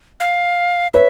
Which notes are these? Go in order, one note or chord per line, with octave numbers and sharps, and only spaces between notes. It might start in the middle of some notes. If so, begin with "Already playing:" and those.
F5
B4 C#5 E5